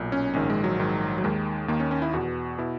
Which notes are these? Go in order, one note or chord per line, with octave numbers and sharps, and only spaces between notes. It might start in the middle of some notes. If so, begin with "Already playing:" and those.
Already playing: B1 A#2
C#4
A#1 G#2 D#3 C#4
G#3
F#3
A#1 G#2 D#3
F#3
D#2 D#3 G#3
D#2 D#3 A#3
C#4
C#4
E4
E2 B2 F#4
B2 E4